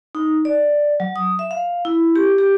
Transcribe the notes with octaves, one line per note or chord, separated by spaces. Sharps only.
D#4
D5
F#3
D#6
E5
F5
E4
G4
G4